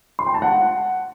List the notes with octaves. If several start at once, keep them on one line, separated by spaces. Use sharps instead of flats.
C6
G5
A5
F#5